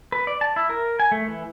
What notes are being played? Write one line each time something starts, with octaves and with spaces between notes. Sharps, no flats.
B4
D5
A5
E4
A#4
G#5
A3
E3